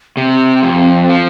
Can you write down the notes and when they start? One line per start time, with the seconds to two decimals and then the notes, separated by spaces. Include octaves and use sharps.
0.17 C3 C4
0.63 F2
1.10 F3